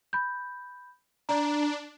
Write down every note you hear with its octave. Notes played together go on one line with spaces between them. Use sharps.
B5 G6
D4 D5 A#5